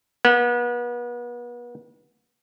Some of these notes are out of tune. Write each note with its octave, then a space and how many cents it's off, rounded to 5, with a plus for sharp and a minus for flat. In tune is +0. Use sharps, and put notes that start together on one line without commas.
B3 -35